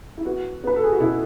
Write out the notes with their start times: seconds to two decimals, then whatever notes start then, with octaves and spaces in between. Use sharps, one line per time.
0.18 E4
0.25 B3 F#4
0.64 B3 B4
0.76 A4
0.83 G#4
0.92 F#4
1.00 B2 E4